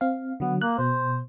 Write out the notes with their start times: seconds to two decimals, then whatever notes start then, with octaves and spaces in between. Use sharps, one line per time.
0.01 C4 F5
0.40 D3 F#3 B3
0.61 A#3 F#6
0.79 B2 C5